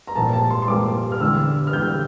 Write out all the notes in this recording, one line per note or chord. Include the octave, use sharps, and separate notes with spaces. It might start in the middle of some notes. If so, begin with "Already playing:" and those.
A#5
A#1 A#2 G3 A5
A5
C6
C6
A#1 A#2 G3 D6
F6
E2 D3 G3 E6
F6
E2 D3 G3 G6